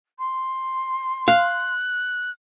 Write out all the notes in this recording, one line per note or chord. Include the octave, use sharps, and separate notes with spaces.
C6
F5 F#6